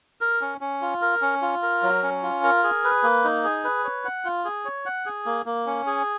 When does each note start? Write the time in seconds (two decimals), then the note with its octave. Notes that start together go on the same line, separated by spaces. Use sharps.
0.21 A#4
0.41 C#4
0.61 C#4
0.82 F4
1.02 A#4
1.22 C#4
1.42 F4
1.62 A#4
1.83 F#3
2.03 C#4
2.23 F4
2.43 A#4
2.63 G#4
2.84 B4
3.03 A#3
3.24 D#4
3.44 G#4
3.64 B4
3.84 C#5
4.05 F#5
4.25 F4
4.45 G#4
4.65 C#5
4.86 F#5
5.06 G#4
5.26 A#3
5.46 A#3
5.66 C#4
5.86 G#4